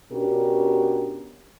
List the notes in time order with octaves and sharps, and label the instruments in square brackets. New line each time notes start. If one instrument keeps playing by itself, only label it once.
[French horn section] B2 C#4 D4 G4 A#4